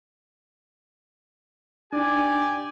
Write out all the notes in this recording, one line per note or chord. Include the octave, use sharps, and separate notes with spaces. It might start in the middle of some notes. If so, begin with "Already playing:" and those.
D4 D#4 G4 D5 G#5